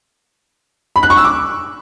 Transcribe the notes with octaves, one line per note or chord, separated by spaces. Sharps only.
B5
F#6
C#6
E6
D6